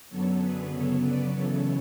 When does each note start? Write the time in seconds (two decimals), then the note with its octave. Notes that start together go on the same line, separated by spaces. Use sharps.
0.09 F#2 D3 F#3 B3 A4 C#5
0.40 G#4 B4
0.70 F#2 C#3 F#3 B3 A4 C#5
1.01 B4 D5
1.32 F#2 C#3 E3 A4 C#5